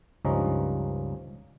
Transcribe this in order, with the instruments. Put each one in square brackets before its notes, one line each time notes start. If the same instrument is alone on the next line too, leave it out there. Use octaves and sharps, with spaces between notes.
[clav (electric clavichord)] C#2 G2 F3 C#4 D#4 A#5